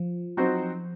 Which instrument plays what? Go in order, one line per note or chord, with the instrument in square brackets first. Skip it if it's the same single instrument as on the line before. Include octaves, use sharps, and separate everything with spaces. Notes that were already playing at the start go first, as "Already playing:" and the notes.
Already playing: [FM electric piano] F3
[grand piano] F#3 C4 D#4 F#4 C5